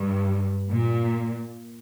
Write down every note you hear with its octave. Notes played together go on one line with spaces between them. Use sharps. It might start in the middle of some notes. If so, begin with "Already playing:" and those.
Already playing: G2
A#2